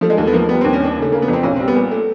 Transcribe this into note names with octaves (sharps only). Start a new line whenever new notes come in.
F3 A3
G#3
D#2 A3
B3
F3 A#3
G3 B3
D#2 C4
C#4
D#3 D4
C#3
A3
C#3 A#3
B3
F2
C4
B1 C#4
G3 C4
B3
A#2
A3